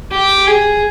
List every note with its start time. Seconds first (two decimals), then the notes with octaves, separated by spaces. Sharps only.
0.12 G4
0.47 G#4